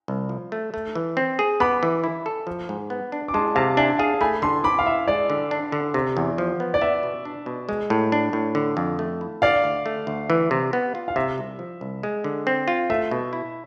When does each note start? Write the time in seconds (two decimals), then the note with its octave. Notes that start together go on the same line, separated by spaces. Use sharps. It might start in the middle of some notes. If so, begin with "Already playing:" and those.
0.08 C2
0.29 F3
0.52 A3
0.74 A3
0.95 E3
1.17 C4
1.39 G#4
1.60 B3 B5 D6
1.83 E3
2.04 E4
2.26 A4
2.47 F3
2.69 G#2
2.90 B3
3.12 D4
3.28 D6
3.34 G#3 A5 C6
3.55 C3 F5 A5
3.77 D4 E5 G#5
3.99 G#4 F5 A5
4.21 A3 G#5 B5
4.42 D3 A5 C6
4.64 C4 B5 D6
4.79 F5
4.86 E4 E5
5.08 G#3 D5
5.30 D3
5.51 D4
5.72 D3
5.94 C3
6.17 E2
6.38 F3
6.60 B3
6.74 D5
6.81 B3 E5
7.03 B2
7.25 D4
7.46 B2
7.69 G#3
7.90 A2
8.12 D4
8.33 A2
8.55 D3
8.77 F2
8.99 A3
9.21 E4
9.42 D3 D5 F5
9.64 D2
9.86 A3
10.07 D2
10.30 E3
10.51 C3
10.73 B3
10.95 F4
11.08 F5
11.16 C3 E5
11.38 C2
11.59 F3
11.81 C2
12.03 G#3
12.24 D3
12.47 C4
12.68 F4
12.90 A3 E5
13.11 B2
13.33 E4